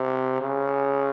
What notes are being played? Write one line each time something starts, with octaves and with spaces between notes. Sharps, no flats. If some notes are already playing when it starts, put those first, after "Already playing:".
Already playing: C3
C#3